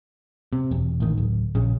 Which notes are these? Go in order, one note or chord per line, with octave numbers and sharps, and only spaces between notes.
C3
E1
A1 D#3
D1
A#1 C#3